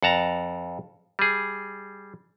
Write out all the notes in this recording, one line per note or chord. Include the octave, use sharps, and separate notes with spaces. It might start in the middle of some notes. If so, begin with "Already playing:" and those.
F2 F#5 A5 A#5
G3 G#4